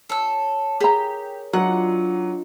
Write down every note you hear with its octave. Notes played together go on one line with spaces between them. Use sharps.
A4 C#5 E6
G4 G#4 A#4 A#5
F#3 D4 D#4 F4 F#5